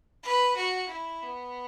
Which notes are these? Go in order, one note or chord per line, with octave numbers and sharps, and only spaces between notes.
B4
F#4
E4
B3